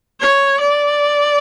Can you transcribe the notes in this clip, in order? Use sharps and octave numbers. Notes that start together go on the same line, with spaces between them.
C#5
D5